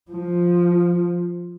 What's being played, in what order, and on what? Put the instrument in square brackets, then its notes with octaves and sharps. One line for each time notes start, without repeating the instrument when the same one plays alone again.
[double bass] F3